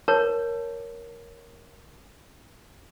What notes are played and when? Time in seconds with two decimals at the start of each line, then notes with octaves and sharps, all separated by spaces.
0.08 A#4 C#5 A5